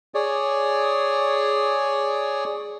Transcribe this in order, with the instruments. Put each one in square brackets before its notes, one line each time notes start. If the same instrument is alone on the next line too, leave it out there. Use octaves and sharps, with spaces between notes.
[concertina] G#4 C#5 D5